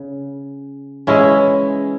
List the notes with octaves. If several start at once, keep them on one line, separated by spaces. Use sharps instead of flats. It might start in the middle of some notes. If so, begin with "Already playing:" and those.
Already playing: C#3
E3 G#3 C#4 E4